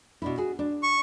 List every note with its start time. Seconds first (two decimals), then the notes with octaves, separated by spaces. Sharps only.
0.22 B2 D4 E4
0.38 F#4 G#4
0.59 D4
0.83 C#6